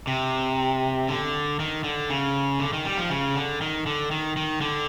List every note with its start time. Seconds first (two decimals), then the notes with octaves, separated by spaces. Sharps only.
0.07 C3
1.08 D3
1.60 D#3
1.84 D3
2.10 C#3
2.60 D3
2.73 D#3
2.85 G3
2.98 F3
3.10 C#3
3.36 D3
3.61 D#3
3.86 D3
4.11 D#3
4.37 D#3
4.61 D3